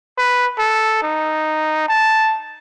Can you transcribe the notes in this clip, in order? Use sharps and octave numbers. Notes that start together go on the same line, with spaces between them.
B4
A4
D#4
A5